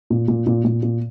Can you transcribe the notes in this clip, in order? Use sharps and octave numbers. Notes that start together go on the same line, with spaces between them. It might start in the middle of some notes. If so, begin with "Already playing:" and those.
A#2
A#2
A#2
A#2
A#2